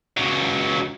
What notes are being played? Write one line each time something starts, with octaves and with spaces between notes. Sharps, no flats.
C#2 F#3